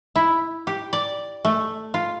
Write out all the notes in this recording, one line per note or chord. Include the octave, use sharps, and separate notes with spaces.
E4
G4
D5
A3
F4